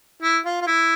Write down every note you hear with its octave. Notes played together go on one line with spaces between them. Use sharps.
E4
F4
F4
E4